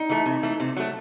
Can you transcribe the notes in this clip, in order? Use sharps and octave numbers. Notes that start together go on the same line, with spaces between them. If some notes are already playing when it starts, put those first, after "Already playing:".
Already playing: D#4
E3 A3
C3
E3 A3
C3
F#3 A3